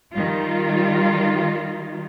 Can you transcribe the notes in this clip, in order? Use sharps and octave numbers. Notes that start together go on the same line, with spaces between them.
D#3 G3 F4